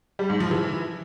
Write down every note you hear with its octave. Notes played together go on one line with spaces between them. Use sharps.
G3
G#2
F3
E3